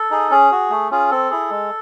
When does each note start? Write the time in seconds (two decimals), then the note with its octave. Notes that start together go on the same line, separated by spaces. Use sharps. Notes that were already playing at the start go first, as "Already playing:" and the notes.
Already playing: A4
0.11 D#4 G#4
0.31 C#4 G#4
0.51 F#4
0.70 A3
0.91 C#4 F4 G#4
1.11 C4 A4
1.31 E4 G#4
1.50 G#3